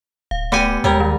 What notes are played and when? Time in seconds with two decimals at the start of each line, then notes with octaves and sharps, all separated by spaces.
0.31 D1 F5
0.52 A3 B3 G4 G#5 D6 C#7
0.84 D#2 G3 G#3 A#4 G#6
1.00 D#3